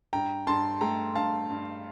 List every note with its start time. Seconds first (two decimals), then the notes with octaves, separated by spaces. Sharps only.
0.13 G2 G5 A#5
0.47 G2 A5 C6
0.81 A3 G5 A#5
1.15 G2 F5 A5
1.50 G2